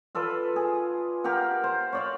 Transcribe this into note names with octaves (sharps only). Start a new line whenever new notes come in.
F4 A4 B4 D5
G#4
G4 A#4 F5 F#5
C5
C#5 D5 F5